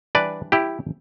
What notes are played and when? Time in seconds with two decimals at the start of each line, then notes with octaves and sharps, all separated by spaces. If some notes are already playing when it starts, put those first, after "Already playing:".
0.15 E3 G3 D4 B4 D5
0.52 E4 G4